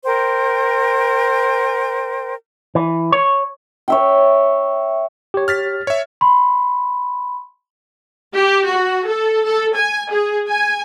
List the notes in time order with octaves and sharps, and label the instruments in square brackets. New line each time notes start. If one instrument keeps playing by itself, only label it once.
[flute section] A#4 C5 G5
[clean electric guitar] E3
C#5
[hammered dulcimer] C#5 E5 G5
[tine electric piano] G4 C#5
[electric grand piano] F6 A6 B6
C#5 E5
[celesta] B5 C6
[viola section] G4
F#4
A4
A4
G#5
G#4
G#5